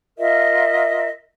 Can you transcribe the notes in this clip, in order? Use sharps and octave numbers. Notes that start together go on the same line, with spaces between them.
F4 A#4 D#5 E5